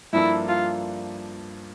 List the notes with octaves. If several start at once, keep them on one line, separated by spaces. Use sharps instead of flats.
G2 F3 A#3 D4 E4 A4
F4